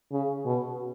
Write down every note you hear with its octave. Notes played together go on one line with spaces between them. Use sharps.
C#3
B2